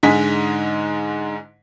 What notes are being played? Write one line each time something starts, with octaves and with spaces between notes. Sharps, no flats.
G#2 D3 G#3 D#5 G#5 B6